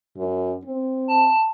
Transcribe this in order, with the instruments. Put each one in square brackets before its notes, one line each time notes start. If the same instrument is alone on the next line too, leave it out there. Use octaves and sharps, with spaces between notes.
[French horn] F#2
C4
[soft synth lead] A5